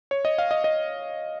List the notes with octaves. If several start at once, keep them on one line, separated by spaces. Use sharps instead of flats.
C#5
D#5
F5
D#5
D#5